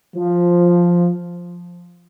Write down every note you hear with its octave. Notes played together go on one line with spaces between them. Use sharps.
F3